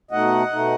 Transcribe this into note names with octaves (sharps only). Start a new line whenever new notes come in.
B2 A3 D#4 D#5 F#5
B2 A3 D#4